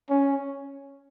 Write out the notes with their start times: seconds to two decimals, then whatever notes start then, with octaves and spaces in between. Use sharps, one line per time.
0.10 C#4